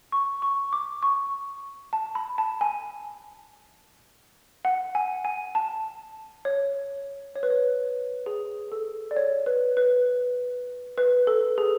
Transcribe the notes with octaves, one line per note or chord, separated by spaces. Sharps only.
C#6
C#6
D6
C#6
A5
B5
A5
G#5
F#5
G#5
G#5
A5
C#5
C#5
B4
C#5
G#4
A4
D5
C#5
B4
B4
B4
A4
G#4